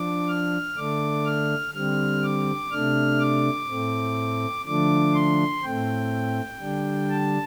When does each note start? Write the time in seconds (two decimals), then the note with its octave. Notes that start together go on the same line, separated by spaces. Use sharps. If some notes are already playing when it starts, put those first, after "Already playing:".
Already playing: F3 D4 D6
0.28 F6
0.76 D3 A3 D4 D6
1.26 F6
1.74 D3 G3 C4 F6
2.23 D6
2.71 C3 A3 D4 F6
3.20 D6
3.68 A2 A3 C4
4.66 D3 F3 A3 D4 D6
5.14 C6
5.63 A2 A3 C4 G5
6.60 D3 G3 D4
7.09 A5